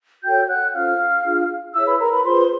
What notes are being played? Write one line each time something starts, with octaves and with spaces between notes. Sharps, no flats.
F#4 A4 C#5 G5 G6
F#5 F#6
C#4 F4 A4 C5 F5 F6
D4 F4 G#4
E4 G#4 C#5 E5 E6
B4 B5
A#4 A#5
B4 B5
F4 G#4 B4 C5 C6